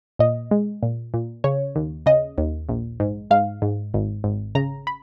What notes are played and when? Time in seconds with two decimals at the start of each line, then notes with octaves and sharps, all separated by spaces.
0.19 A#2 D#5
0.51 G#3
0.83 A#2
1.14 A#2
1.44 C#3 C#5
1.76 D#2
2.06 C#3 D#5
2.38 D#2
2.69 A#1
3.00 G#2
3.31 G#2 F5
3.62 G#2
3.94 G#1
4.24 G#1
4.55 C#3 A#5
4.87 B5